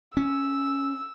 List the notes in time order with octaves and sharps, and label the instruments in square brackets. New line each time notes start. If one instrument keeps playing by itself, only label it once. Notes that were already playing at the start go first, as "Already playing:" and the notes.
[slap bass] C#4 [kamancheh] E6